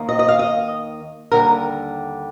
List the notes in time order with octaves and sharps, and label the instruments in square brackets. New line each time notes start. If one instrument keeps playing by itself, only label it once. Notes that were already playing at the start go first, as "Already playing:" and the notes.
Already playing: [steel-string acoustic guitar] D#2 D#3 A#3
D#5
D#5
F5
D#5
D#2 D3 G3 A#4